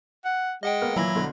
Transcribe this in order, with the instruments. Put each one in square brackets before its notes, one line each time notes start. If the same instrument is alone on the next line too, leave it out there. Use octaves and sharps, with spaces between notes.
[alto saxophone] F#5
[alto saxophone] G#3 [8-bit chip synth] D#5 F#5 G5
[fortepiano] A#3 B3 F6
[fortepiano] A#2 E3 [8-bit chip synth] F#3 B5 A#6 [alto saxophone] E4
[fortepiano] B1 D3